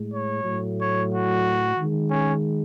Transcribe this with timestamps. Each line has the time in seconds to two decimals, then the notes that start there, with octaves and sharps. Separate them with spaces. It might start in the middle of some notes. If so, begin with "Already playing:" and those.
Already playing: A2 G#3
0.11 C#5
0.44 A2 F#3 A3
0.78 C#5
1.11 F#4
1.76 D#3 G#3
2.08 C#4